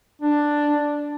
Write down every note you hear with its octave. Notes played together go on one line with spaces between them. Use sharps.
D4